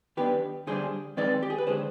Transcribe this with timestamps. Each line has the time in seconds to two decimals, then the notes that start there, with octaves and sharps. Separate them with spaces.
0.17 D#3 B3 D4 G4 B4
0.67 D3 G3 D4 G#4 C5
1.17 D#3 G#3 C4 D#4 B4 D5
1.43 G4
1.50 G#4
1.58 B4
1.67 D3 G#3 D4 G#4 C5